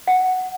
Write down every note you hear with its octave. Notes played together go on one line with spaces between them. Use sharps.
F#5